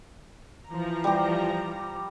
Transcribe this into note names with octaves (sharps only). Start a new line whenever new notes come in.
E3 F3 A#5
G3 G4